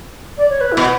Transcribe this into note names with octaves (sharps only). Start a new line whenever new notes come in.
D5
C#5
B4
E4
B2